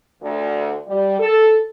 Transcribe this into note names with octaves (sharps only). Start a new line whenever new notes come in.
D2
G3
A4